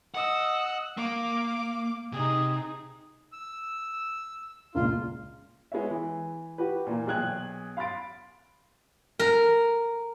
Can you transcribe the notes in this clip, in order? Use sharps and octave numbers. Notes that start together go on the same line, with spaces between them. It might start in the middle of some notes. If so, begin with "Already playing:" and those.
D#5 F#5 E6
A#3 F5 D6
C3 D#4 G#4
E6
C#2 A#2 F4
G#3 B3 C#5 E5
E3
F#4 G4 B4
A#2 E3 A#3
B1 G#4 G5 F#6 G#6 F#7
F5 B5 C6 A6 D7
A#4